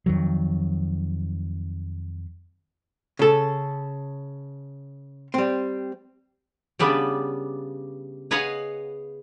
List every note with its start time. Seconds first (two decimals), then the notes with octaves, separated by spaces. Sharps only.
0.06 F2 D#3 F#3
3.19 C#3 A4
5.34 G3 C4
6.79 C#3 G3 B3 D4 B4
8.31 G#4 B4 C#5 D#5 F5 F#5